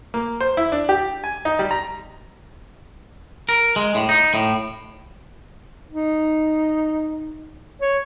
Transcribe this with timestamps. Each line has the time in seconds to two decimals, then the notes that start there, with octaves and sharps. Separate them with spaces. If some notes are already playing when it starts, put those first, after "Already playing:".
0.14 A#3
0.41 C5
0.57 E4
0.72 D4
0.89 G4
1.24 G#5
1.45 D#4
1.59 G3
1.71 A#5
3.49 A#4
3.76 G#3
3.95 A2
4.09 D#4
4.34 A2
5.90 D#4
7.81 C#5